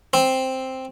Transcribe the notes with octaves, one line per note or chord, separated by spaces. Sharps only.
C4